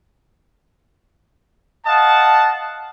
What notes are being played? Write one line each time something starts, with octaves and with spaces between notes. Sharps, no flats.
D#5 F5 F#5 A5